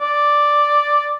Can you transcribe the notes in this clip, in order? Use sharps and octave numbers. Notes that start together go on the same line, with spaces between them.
D5